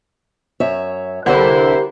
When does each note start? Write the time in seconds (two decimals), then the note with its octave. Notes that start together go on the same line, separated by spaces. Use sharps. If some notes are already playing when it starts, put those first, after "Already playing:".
0.60 F#2 C#5 E5
1.26 C2 D3 E4 G4 A#4 C5 F#5